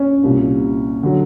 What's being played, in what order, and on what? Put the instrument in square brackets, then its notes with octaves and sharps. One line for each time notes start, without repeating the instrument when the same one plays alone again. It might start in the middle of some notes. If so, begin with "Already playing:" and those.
Already playing: [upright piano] C#4
C2 A#2 G3 A#3
D3 F#3